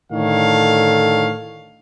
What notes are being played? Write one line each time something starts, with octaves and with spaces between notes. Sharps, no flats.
A2 D3 D#3 A4 C#5 F5